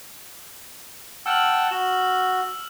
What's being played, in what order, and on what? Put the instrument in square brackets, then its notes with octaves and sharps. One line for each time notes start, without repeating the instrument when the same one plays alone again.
[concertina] F#5 G5 A5 [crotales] E6 F6 F#7
[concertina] F#4 [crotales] E7